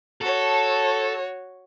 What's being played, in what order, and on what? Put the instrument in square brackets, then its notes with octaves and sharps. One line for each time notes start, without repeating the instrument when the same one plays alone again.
[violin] F#4 C#5 [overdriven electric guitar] A4